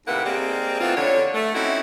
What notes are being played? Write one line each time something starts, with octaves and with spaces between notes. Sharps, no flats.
D#2 A2 C3 A#3 B4 F#5
G3 G#3 A#3 C4 G4
E3 A3 B3 C4 F4
F2 D3 C#5
A3
C4 C#4 D#4 E4 F#4